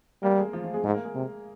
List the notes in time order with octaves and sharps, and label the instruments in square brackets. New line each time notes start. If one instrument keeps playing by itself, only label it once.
[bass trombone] G3 [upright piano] A#3 A#4
[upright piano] G#3 G#4
F3 F4
F3 F4
G#3 G#4
[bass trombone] G#2 [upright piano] G#3 G#4
[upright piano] A#3 A#4
G#3 G#4
[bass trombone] C3